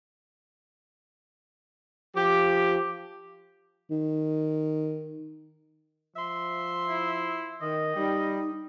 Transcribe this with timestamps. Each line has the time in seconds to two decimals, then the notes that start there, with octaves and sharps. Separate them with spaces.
2.16 F3 G4
3.91 D#3
6.16 F3 E5 C6
6.89 E4
7.61 D#3 D#5
7.96 G3 D#4